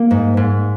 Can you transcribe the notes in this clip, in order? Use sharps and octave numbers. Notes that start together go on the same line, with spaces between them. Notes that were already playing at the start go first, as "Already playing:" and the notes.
Already playing: A#3
G#2
G#2